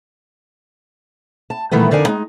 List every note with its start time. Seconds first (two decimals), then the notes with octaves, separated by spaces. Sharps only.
1.50 A5
1.71 A#2 D#3 E3 G3 A3 B3
1.91 F2 D3 D#4 A#4 D5 G#5
2.06 G#3 D#4